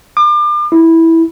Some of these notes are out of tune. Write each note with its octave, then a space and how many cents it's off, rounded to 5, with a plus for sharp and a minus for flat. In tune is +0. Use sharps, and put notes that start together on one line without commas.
D6 +35
E4 -10